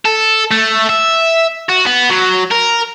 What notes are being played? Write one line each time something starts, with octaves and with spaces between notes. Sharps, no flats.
A4
A3
E5
F#4
B3
F#3
A#4